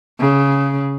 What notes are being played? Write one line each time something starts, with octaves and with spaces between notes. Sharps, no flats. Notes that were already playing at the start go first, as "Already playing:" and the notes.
C#3